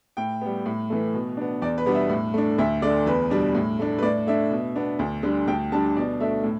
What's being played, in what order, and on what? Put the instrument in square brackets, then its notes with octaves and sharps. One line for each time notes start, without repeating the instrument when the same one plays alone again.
[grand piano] A2 G5
G3 B3
A2
E3 A3
B2
B3 D4
E2 D5
B4
B2 G3 B3 D4
E5
A2
A3 D4
D2 E5
D3 A3 D5
E2 B4
B2 G3 D4
A2
A3 D4
B4
A2 D5
A3 D4 E5
B2
B3 D4
D2
D3 G3 D4
D2 G5
D3 G3 D4 A5
B2 D5
A3 D4 E5
A2